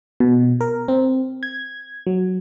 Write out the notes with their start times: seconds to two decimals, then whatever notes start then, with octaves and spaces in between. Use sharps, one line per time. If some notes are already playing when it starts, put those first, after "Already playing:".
0.20 B2
0.61 A#4
0.88 C4
1.43 G#6
2.07 F#3